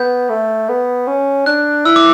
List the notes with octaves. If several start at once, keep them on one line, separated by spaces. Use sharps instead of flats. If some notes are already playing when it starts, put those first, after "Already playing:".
Already playing: B3 G6
A3
B3
C#4
D4 F#6
E4 E6
D6